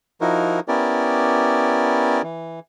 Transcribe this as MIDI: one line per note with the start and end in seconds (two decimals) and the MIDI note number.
0.21 0.60 53
0.21 0.60 63
0.21 0.60 64
0.21 0.60 66
0.21 0.60 70
0.68 2.22 59
0.68 2.22 61
0.68 2.22 64
0.68 2.22 67
0.68 2.22 70
0.68 2.22 74
2.23 2.60 52